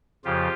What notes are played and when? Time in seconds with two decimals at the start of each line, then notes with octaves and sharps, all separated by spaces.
0.24 F2 C#3 F3 F4 G4